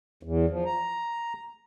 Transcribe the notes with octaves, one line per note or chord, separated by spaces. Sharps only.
E2
F3
A#5